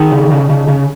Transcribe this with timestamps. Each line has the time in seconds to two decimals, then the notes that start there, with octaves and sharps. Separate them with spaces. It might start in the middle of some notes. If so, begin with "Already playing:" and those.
Already playing: D#3 D#4 G#4
0.12 C#3
0.31 C#3
0.50 C#3
0.68 C#3